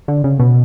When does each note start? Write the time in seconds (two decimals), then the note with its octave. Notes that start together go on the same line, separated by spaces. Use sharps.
0.08 D3
0.24 C#3
0.40 B2